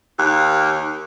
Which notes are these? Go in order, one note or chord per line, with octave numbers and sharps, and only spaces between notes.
D#2